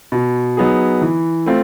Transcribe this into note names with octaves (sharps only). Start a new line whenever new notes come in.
B2
F#3 B3 D#4 G#4
E3
A3 C4 F4